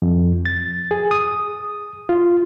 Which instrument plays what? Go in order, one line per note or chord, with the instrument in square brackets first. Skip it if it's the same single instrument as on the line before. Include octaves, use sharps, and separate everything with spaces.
[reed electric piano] F2
A6
G#4
D#6
F4